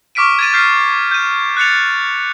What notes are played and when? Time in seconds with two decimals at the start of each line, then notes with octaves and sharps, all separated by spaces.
0.15 C#6 D6 F6 B6 D7 D#7
0.39 G#6 A6 D#7
0.53 F6 G6 B6 C7 D#7
1.11 G6 D#7
1.57 F#6 A6 C#7 F7